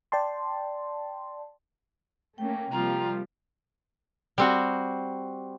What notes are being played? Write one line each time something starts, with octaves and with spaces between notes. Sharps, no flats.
D5 G5 A5 C6
A3 A#3 C#4 G5
C3 F3 G3 A#3 F4 A#5
G3 C4 F#4